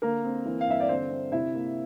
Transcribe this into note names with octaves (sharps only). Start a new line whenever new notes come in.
D3 A#3 A#4
C4
E3
F5
G2 E5
D5
D3 C4 C5
C4
C3 E4 E5
A#3